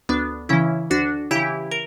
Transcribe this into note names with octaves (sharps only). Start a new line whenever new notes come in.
D2 B3 D4
C#3 E3 C#4 E4
D2 D4 F#4
C#3 E3 E4 G4
A#4